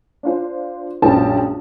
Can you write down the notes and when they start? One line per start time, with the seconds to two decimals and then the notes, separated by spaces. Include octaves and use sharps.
0.23 D4 F4 C5
1.02 A#1 F#2 A#2 G#3 G5 A5